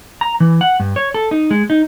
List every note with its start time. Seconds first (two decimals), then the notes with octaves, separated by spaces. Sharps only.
0.21 A#5
0.40 E3
0.61 F#5
0.80 G2
0.96 C#5
1.14 A4
1.31 D#4
1.51 G#3
1.70 D#4